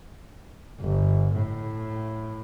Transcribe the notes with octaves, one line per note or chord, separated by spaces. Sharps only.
G1
A2